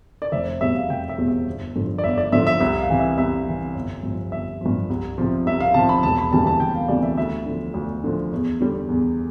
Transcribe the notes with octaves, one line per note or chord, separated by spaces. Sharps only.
D5
F1 E5
E2 B2 G3 E5
F5
F1 G5
E5
E2 B2 G3
E5
G1
G2 D3 F3
D5
G1 E5
D5
G2 D3 F3 E5
E5
C2 E5
F5
C3 E3
E5
C2 E5
C3 E3
G1
G2 F3
G1 E5
G2 F3
C2
C3 F3
C2 E5
F5
C3 F3 A5
B5
E1 A5
B5
D2 C3 E3 G3 A5
A5
E1 G5
F5
D2 C3 E3 G3 D5
E5
D2 E5
D3 F3
D2
D3 F3
E2
D3 G3
E2